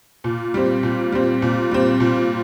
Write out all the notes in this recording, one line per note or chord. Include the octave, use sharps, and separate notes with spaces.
A#2
G3 C4
A#2
G3 C4
A#2
G3 C4
A#2